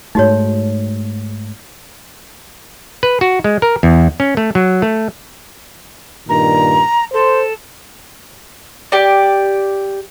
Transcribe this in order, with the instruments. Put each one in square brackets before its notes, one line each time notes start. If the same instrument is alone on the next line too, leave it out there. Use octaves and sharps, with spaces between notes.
[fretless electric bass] G#2 A3 [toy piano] D#4 F#4 C#5
[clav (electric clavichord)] B4
F#4
G#3
A#4
E2
C#4
A3
F#3
A3
[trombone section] G2 A#2 D#3 [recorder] A#5
[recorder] A4 [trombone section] C5
[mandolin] G4 D5